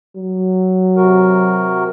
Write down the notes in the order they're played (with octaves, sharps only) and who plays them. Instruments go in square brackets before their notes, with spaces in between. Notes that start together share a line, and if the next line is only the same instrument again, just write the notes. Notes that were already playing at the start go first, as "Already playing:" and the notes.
[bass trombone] F#3
[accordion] C3 F#4 A#4